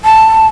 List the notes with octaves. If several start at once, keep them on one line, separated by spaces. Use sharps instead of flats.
A5